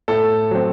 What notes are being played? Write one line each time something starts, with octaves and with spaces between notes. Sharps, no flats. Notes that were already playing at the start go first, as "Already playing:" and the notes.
A2 A4
F#3 C4